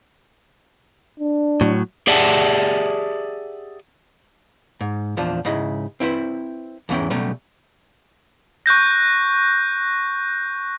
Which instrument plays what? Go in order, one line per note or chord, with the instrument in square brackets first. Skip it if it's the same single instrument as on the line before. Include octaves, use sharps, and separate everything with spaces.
[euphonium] D4
[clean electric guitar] A2 F#3
G4 G#4 D5 E5 F#5 A5
[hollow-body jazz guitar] G#2
E2 A#2 F3 D4
G#2 C#3 E4 D#5
C4 E4 B4 C5
E2 G#2 E3 C#4 E4 G5
B2 F#3 G3 A3 C#4
[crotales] C#6 F#6 G6 A#6